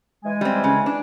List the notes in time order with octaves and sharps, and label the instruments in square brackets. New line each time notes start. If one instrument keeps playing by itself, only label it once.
[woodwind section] E3 G#3 G#5
[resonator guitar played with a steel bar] G3 C4
C#3
D4